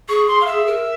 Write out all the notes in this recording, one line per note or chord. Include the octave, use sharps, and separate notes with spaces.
G#4 C#6
C6
F5
E5
A#4